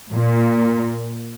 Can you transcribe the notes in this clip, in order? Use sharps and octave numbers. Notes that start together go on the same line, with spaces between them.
A#2